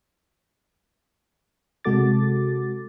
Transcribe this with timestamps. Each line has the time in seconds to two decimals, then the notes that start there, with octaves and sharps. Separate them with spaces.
1.84 C3 G#3 F#4 A4 D6 A6